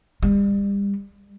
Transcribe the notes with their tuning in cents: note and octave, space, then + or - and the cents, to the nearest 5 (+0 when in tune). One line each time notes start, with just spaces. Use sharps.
G3 +35